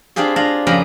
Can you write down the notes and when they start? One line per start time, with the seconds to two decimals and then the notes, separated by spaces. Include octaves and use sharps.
0.16 C4 D4 F4 G4 G#4
0.36 D4 F4 A#5
0.67 F2 C#3 C#4 G4 A#4 B5